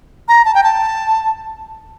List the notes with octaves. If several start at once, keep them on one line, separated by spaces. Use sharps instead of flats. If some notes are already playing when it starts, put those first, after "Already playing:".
A#5
A5
G5
A5